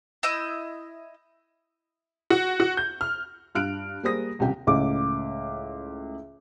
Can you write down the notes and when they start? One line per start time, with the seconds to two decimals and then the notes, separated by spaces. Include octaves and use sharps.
0.23 E4 D#5 E6 G6
2.30 F#4
2.60 F#4
2.77 G6
3.01 F6
3.55 G2 F5 F6 F#6 D7
4.03 G3 A#3 G#4 C5 D#6 A#6
4.39 D#1 C2 C#3 G4 G5
4.67 C#2 A2 D6